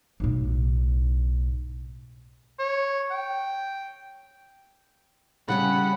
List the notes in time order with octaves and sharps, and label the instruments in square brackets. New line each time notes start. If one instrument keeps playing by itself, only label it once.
[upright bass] B1 A2
[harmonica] C#5
G5
[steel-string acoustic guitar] C#3 G3 C#4 [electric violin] F#5 B5